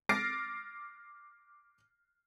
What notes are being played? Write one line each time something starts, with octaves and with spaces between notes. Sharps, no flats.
D6 F6 A6 A#6 C7 D7